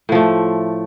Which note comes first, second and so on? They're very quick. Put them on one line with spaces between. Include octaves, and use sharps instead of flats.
A2 F3 A3